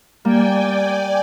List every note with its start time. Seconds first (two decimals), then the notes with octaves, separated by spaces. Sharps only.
0.25 G3 A#3 D5 G5 G#5